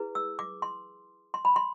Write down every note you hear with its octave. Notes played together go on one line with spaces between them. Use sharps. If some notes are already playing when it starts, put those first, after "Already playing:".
Already playing: E4 G#4 B4
E6
D6
C6
C6
B5
C6